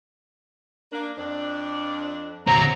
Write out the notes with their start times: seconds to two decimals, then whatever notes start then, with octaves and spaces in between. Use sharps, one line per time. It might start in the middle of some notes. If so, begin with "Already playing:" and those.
0.92 A#3 D4
1.18 F2 D4
2.47 D3 F#3 C4 A#5